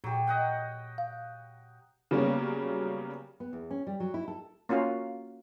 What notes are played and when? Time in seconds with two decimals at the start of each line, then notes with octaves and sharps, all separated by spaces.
0.04 A#2 F#3 G4
0.27 D#5 F#5 G5
0.98 F5
2.11 C#3 F#3 G3 A#3 B3 C#4
3.40 B3
3.53 E2
3.71 C#4
3.87 G3
4.00 F#3
4.14 E4
4.28 A4
4.69 A#3 C#4 F4 F#4 F5